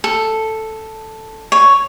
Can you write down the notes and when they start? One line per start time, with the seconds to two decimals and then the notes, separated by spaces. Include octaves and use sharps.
0.04 A4
1.52 C#5